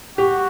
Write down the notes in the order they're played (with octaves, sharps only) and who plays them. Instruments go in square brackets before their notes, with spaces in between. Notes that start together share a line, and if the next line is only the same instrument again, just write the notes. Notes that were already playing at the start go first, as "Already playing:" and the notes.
[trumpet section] F#4 [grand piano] G4